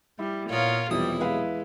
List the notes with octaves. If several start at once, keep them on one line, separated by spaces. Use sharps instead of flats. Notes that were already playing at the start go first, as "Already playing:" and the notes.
G3 E4
A#2 B3 F4 A#4 C#5
B1 E2 C3 F3 G3 E4 D#6
G#3 E4 B4 F5